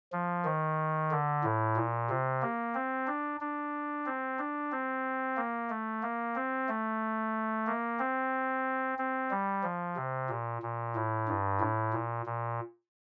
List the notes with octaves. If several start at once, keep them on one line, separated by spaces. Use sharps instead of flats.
F3
D#3
D3
A2
A#2
C3
A#3
C4
D4
D4
C4
D4
C4
A#3
A3
A#3
C4
A3
A#3
C4
C4
G3
F3
C3
A#2
A#2
A2
G2
A2
A#2
A#2